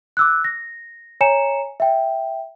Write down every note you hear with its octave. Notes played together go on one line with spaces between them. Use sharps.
D6 E6 F#6
A#6
C#5 G#5 A#5 C#7 E7
E5 G5